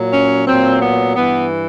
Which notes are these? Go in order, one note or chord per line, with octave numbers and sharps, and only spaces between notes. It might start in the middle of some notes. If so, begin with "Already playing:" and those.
Already playing: A#2 F#3
C#4
A#2 F#3 C4
B3
G2 E3 B3